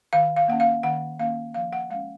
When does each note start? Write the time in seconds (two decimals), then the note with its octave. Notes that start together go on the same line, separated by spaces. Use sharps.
0.13 D#3 F5
0.37 F5
0.48 A#3 C#4 F#5
0.60 F5
0.83 D#3 F#5
1.19 A#3 C#4 F5
1.54 F3 F5
1.73 F#5
1.90 G#3 F5
1.94 C#4